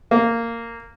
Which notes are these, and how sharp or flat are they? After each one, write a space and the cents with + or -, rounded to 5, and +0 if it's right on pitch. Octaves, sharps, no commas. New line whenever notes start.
A#3 -15